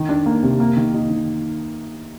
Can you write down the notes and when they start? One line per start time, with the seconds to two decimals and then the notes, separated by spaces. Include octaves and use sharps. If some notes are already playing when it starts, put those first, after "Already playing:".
Already playing: D#3
0.09 D4
0.26 A#3
0.43 C3
0.60 A#3
0.77 D#3
0.94 D#4
1.10 D#3